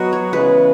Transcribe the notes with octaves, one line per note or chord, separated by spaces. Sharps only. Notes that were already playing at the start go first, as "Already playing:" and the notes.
Already playing: F#3 B3 F#4 D#5
C#5
C#3 E3 G#3 B3 B4